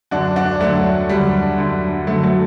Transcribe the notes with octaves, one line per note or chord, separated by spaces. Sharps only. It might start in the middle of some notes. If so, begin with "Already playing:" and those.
F#2 D3 D4 F#4
D4 F#4
F#2 D3 F#3 A3
F#2 D3 G3
F#2 D3
F#2 D3 F#3 A3
F#3 A3